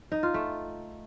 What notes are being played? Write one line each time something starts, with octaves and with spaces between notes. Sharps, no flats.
D#4
F4
A3